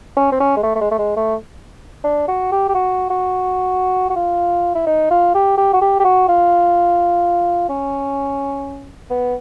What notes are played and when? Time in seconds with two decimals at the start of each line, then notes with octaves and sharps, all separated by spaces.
0.17 C#4
0.32 C4
0.40 C#4
0.57 G#3
0.63 A3
0.75 A3
0.81 G#3
0.91 A3
0.99 G#3
1.17 A3
2.04 D4
2.28 F#4
2.52 G4
2.69 G4
2.75 F#4
3.10 F#4
4.10 F#4
4.16 F4
4.75 E4
4.87 D#4
5.10 F4
5.35 G4
5.57 G4
5.73 F#4
5.82 G4
5.99 G4
6.04 F#4
6.28 F4
7.69 C#4
9.10 B3